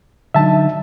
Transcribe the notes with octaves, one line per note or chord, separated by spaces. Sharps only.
D3 F#3 D#4 E5 A5